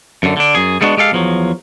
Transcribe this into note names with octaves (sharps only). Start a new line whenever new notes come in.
F#2 D3
D3 D4
F#2 G#4
G3 G#3 B3 D4 F#4
G#3 G4 A4 F5
E2 F3 F#3